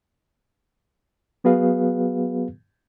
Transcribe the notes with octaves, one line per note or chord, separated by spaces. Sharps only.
F#3 B3 F#4 G#4 B4 F5